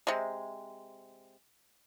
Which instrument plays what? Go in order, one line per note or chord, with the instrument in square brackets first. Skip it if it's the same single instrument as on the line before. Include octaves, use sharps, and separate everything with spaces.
[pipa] C3 G#3